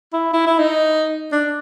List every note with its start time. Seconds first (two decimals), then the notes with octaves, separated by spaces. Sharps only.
0.13 E4
0.33 E4
0.47 E4
0.59 D#4
1.32 D4